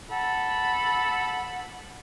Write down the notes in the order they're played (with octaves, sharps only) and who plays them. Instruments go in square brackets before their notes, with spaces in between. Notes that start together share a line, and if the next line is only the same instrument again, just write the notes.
[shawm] A4 [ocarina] F#5 [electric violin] B5